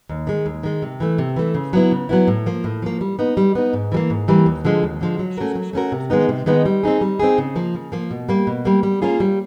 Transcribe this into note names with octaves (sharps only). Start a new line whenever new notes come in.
D#2
D#3 G#3
D#2
D#3 G#3
C3
E3 A3
C3
E3 A3
C#3
F#3 B3 E4
C#3
F#3 B3 E4
A2
F3 A#3
A2
F3 A#3
G3
B3 D#4
G3
B3 D#4
G#2
E3 G3 A#3
G#2
E3 G3 A#3
D#2
D3 F3 G#3
D#2
D3 F3 G#3
F#3
A3 C#4 F#4 A#4
F#3
A3 C#4 F#4 A#4
C3
D#3 G#3 B3 D#4
C3
D#3 G#3 B3 D#4
G3
C4 D#4 G#4
G3
C4 D#4 G#4
C#3
F3 A#3
C#3
F3 A#3
B2
G3 A#3
B2
G3 A#3
G3
A#3 C#4 F4 G#4
G3